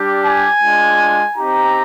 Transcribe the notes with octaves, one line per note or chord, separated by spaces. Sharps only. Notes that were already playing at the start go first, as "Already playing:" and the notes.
Already playing: G3 D4 G4
G#5
G#3 D4 F4
C4 D#4 G4 A#5